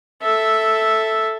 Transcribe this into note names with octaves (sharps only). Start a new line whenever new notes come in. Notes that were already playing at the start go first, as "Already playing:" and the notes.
A4 E5